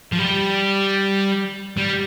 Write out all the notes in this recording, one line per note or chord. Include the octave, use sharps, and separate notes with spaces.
F3
G3
G3